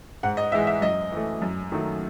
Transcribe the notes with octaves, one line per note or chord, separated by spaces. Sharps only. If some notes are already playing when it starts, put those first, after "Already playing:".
G#2 F#5
D#5
E3 G#3 E5
E5
F#2 D#5
E3 A3
F#2
D#3 F#3 A3